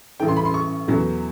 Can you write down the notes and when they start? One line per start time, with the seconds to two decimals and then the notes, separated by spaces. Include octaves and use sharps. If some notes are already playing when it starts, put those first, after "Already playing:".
0.20 A1 G2 E3 A3 G5
0.28 C6
0.36 B5
0.45 C6
0.54 C#6
0.88 E2 B2 F#3 A3